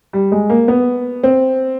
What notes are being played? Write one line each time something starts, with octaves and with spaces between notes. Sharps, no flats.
G3
G#3
A#3
B3
C4